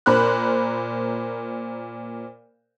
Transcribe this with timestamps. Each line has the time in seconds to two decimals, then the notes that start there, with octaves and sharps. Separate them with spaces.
0.06 A#2 A#4 C5 B5 F#6